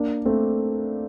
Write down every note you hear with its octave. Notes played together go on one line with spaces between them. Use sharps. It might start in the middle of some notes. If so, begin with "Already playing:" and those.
Already playing: A#3 D4
A3 C4